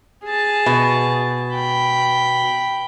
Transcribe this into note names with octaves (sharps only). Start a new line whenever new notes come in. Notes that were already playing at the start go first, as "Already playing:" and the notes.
G#4 A5
B2
G5 B5